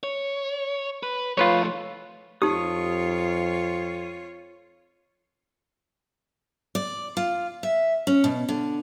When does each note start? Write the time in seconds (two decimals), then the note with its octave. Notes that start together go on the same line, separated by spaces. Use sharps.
0.03 C#5
1.03 B4
1.37 F3 A3 F4 B4 C#5
2.42 F2 D#4 F4 G4 C#5 D#6
6.75 D5
7.17 F4
7.63 E5
8.07 C#4
8.24 B2
8.49 D3